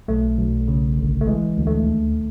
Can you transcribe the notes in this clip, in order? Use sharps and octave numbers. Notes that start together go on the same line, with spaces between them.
B1 A3
B1
C#3
G1
A3
E3 G#3
D2
A3
D#2